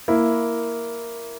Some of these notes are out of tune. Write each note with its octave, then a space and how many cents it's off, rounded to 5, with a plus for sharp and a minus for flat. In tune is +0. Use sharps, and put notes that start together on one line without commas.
A#3 +0 E4 +0